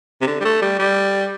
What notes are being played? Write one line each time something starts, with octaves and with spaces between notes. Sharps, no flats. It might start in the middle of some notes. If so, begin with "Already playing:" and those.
C3
D3
G3
A3
G3
G3